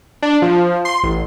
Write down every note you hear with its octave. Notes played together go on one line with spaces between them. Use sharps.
D4
F3
C6
A1